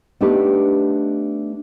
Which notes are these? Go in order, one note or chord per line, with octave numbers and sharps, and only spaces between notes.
A3 B3 D4 D#4 G4 B4